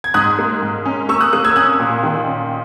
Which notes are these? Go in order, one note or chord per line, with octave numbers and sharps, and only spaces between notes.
G#6
G#2 D#6 F#6
A#3
G#2
C#4
A#3 C#6 E6
D#6 F#6
A#3 D#6 F#6
E6 G#6
C#4 D#6 F#6
A#2
D#3
C#4